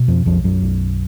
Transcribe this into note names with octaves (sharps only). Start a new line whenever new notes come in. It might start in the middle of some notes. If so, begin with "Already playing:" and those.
Already playing: B2
F2 F3
B1 F2 F3
F#2 F#3
B1